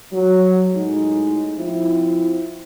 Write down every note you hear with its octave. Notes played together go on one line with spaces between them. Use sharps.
F#3
A2 G#3 D#4
F3 C4 E4